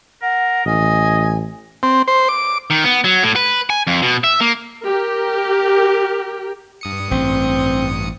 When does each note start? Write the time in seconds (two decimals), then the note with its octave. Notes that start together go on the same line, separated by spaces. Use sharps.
0.22 A#4 F#5
0.66 A1 D#5 G#5
1.83 C4
2.08 C5
2.29 D6
2.70 D#3
2.84 B3
3.04 F#3
3.23 A2
3.36 B4
3.70 G#5
3.87 F2
4.02 B2
4.24 E5
4.41 A#3
4.80 G4 A#4
6.81 G2 D#6 C#7
7.11 A1 C4